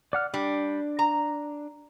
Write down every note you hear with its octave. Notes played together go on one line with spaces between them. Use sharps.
D5 F#5 F6
G3 D4
A#5